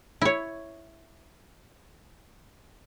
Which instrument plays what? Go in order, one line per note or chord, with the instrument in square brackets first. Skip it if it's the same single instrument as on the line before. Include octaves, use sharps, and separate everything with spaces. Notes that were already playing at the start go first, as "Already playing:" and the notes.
[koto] E4 C#5